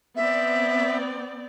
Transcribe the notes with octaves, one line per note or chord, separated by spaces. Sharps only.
B3 C4 D5 E5